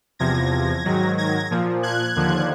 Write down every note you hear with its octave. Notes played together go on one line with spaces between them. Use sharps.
E2 C3 F3 G#6 A#6
G#2 D#3 F#3
G#6 A#6
A#2 F3
F#6 G#6
D#2 D3 F3